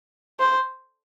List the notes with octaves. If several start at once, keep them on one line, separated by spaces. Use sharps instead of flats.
C5